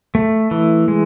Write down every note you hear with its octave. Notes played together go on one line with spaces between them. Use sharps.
A3
E3
G#3